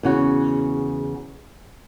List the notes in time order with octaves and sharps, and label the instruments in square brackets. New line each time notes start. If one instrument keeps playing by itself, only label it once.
[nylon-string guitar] E2 C#3 F#4